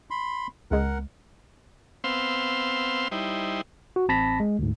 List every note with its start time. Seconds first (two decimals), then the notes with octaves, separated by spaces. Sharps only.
0.11 B5 C6
0.71 C#2 G#3 A#4 F#5
2.04 B3 C4 C5 F5 C6 E6
3.12 G3 D#4 E4 C5
3.96 F#4
4.09 A1 C4 A5 B5 A#6 B6
4.40 G#3
4.59 D2 G#2